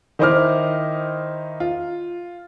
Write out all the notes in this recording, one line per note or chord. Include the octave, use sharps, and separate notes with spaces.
D#3 D#4 E4 C5 D6 F6
F4